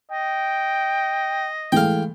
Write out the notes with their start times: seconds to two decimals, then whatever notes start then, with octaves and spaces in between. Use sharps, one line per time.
0.12 D#5 G5
1.72 E3 G#3 A3 F5 G5